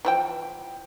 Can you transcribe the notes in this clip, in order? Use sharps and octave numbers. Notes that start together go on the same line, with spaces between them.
E3 F3 G5